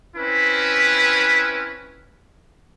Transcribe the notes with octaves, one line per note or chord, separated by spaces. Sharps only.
C4 C#4 E4 B4